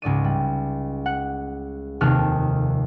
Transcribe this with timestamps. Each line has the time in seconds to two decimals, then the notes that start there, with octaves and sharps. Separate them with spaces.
0.02 C#2 G#2 D5 D#7
0.24 G3
1.06 F#5
2.01 F1 D#2 C3 A4 F6 F#6